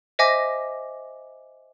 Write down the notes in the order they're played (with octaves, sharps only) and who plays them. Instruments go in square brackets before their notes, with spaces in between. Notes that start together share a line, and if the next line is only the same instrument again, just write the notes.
[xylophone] C5 D#5 E5 G#5 D6 A#6